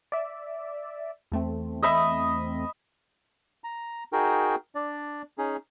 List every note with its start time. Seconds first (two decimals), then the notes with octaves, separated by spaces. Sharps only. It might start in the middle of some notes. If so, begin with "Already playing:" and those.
0.12 D5 E5
1.32 E2 A3 C4
1.83 D#5 E5 B5
3.64 A#5
4.13 D#4 F#4 G#4 A#4 G5
4.75 D4 D5
5.38 C#4 D#4 G#4